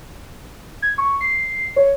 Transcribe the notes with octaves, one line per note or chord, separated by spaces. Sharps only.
G#6
C#6
C7
C#5